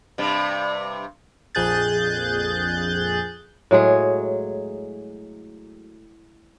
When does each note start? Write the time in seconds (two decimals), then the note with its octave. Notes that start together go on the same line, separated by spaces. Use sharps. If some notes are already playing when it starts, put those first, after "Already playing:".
0.18 G2 C3
1.55 A#1 F2 G#4 F#6 G6 A6
3.71 A2 F#3 G#3 G#4